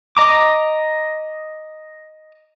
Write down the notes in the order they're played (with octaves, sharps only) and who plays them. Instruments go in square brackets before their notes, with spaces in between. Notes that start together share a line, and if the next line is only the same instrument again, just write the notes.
[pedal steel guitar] D#5 A#5 D6